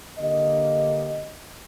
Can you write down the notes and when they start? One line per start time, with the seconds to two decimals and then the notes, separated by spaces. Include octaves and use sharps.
0.19 D3 A#3 G4 D#5